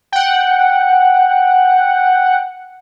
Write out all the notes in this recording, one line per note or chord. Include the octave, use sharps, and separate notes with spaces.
F#5 G5